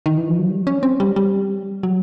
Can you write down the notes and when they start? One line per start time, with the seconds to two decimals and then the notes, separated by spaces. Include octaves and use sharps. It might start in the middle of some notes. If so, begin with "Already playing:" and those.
0.06 D#3
0.17 E3
0.28 F3
0.39 F#3
0.50 G3
0.67 C#4
0.83 C4
1.00 G3
1.16 G3
1.83 F#3